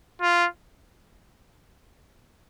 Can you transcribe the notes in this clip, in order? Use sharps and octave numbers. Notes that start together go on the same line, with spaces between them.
F4